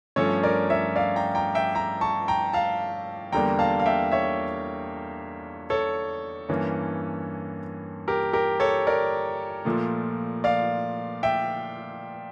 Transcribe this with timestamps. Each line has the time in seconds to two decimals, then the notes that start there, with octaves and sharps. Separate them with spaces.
0.16 G2 F3 A3 C#4 A4 C#5
0.43 A#4 D5
0.70 C#5 E5
0.96 D5 F5
1.16 G5 A#5
1.35 G5 A#5
1.55 E5 G5
1.75 G5 A#5
2.01 A5 C#6
2.28 G5 A#5
2.53 F5 A5
3.32 E2 D3 G3 A#3 D4 G5 A#5
3.59 F5 A5
3.80 F5
3.86 E5 G5
4.12 C#5 E5
5.70 A4 C#5
6.49 G2 E3 A#3 C#4
8.08 G4 A#4
8.33 G4 A#4
8.60 A4 C#5
8.87 A#4 D5
9.65 A#2 F3 A3
10.44 D5 F5
11.23 E5 G5